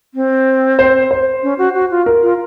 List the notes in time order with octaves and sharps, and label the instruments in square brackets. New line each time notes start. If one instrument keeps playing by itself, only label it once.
[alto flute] C4
[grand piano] C5
C5
[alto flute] C#4
F#4
F#4
F4
[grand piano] A#4
[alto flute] F4